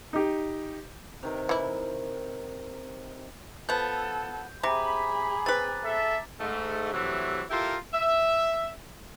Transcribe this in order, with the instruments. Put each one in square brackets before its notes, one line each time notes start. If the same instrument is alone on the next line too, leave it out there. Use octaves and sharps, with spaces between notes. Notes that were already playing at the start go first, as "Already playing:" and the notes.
[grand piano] D#4 G4
[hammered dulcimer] C3 D#3 A#4
[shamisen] E3 E4
[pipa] F3 B3 [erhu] A4 [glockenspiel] G6
[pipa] C3 [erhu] G#4 [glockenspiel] A#5 D6 [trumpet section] B5
[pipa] C4 B4 [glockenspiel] A6
[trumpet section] A4 E5
[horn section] G#2 A3
C3 E3 F#3 G3 A3
E4 F4 G4 A4 A#4
E5